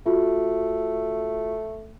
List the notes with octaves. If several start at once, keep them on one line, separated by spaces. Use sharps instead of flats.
A3 F4 F#4